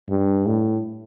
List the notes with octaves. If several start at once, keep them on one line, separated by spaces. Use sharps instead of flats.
G2
A2